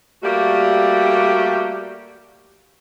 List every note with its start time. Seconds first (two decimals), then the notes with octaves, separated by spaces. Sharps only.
0.22 G3 A3 A#3 F#4 G4